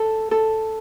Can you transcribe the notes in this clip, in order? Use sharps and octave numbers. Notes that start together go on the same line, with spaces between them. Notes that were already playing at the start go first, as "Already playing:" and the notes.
Already playing: A4
A4